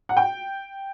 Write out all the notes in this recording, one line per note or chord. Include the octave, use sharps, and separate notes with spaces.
F#5
G5